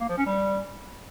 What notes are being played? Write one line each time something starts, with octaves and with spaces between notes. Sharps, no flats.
A#3
F3
C#4
G3